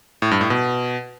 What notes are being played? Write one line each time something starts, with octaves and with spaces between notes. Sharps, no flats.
A2
G2
A2
B2